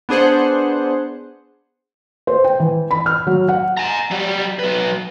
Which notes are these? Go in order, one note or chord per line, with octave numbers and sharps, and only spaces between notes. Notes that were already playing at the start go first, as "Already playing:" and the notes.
B3 D4 G#4 C5 F#5
C5
G5
E3
B5
F6
F#3
F#5
G#5 A#5
F#3 G3
F#3 B4